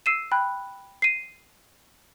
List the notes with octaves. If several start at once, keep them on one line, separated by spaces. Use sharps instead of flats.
E6 C7 D#7 E7
G5 B5 F#6
C7 D#7